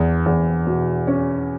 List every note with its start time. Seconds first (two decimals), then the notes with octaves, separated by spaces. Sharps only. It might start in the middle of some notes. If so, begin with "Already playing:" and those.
Already playing: E2
0.26 E2
0.67 B2
1.07 C#4